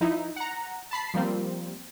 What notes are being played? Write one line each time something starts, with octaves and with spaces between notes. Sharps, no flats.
F3 D#4 E4
F#5 A#5
A5 B5 C7
F3 G3 A#3 C4